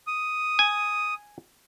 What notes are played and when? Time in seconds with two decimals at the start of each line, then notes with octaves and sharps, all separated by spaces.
0.07 D#6
0.59 G#5